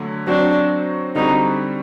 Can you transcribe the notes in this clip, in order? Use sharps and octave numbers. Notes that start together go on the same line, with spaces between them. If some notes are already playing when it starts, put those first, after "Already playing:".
Already playing: D3 F#3 A3
F#3 C4 D4 F#4 C5
D3 G3 C4 D#4 F#4